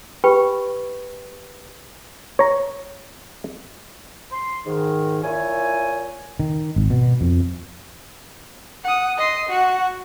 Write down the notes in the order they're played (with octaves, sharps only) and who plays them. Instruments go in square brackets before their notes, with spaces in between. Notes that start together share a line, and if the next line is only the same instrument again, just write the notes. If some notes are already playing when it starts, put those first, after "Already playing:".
[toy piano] G4 B4 G5 B5 C#6
[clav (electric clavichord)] C#5 A#5
[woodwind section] C6
G#2 D#3
A#2 E4 C#5 G#5
[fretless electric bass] D#3
G#1
B2
F2
[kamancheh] F#5 D#6
D#5 C6
F#4 F#5